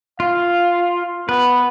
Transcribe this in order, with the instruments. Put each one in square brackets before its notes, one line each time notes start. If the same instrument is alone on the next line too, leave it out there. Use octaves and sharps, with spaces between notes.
[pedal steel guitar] F4 [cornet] F5
[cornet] B3 [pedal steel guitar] B4